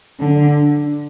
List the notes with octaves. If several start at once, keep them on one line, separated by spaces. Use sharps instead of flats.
D3